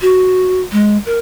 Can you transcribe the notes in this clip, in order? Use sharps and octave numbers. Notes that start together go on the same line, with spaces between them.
F#4
G#3
A#4